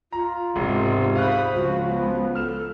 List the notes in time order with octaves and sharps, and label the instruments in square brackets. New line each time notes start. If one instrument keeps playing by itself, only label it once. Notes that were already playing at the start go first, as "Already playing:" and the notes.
[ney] F4 [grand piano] A#5
[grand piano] E1 [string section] G#2 [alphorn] C3
[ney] C5 [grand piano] F5 C#6 F#6 [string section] B5 D#6
[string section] C#2 [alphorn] F3 [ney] F#4
[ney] B3
[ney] A4 [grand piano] F6 E7